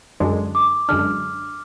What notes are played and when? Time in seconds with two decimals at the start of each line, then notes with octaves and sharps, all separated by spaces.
0.20 F#2 D3 G#3 D4
0.55 D6
0.89 F#2 D3 G#3 D4 F6